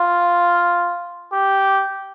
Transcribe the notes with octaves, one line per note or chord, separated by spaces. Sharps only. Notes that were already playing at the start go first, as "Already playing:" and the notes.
Already playing: F4
G4